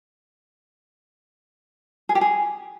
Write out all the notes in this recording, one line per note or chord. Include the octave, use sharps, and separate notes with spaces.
G#4
G4
G#4